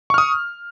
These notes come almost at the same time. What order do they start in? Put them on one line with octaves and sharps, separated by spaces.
C#6 F6 D#6